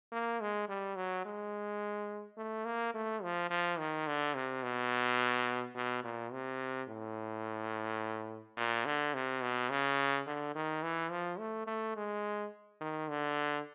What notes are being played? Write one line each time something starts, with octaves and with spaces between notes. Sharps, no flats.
A#3
G#3
G3
F#3
G#3
A3
A#3
A3
F3
F3
D#3
D3
C3
B2
B2
A#2
C3
A2
A#2
D3
C3
B2
C#3
D3
D#3
E3
F3
A3
A3
G#3
D#3
D3